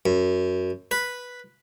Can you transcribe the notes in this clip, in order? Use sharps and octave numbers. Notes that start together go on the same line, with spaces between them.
F#2
B4